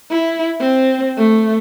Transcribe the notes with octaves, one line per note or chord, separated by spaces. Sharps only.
E4
C4
A3